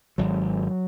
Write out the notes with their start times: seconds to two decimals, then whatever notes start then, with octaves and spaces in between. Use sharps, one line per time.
0.18 G#1 F#3